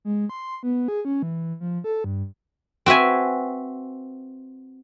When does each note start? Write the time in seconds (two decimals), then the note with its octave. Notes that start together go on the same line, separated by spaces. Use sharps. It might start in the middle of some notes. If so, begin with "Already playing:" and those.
0.05 G#3
0.29 C6
0.63 B3
0.88 G#4
1.05 C#4
1.22 E3
1.60 F3
1.84 A4
2.04 G2
2.86 C4 F#4 B4 E5 G#5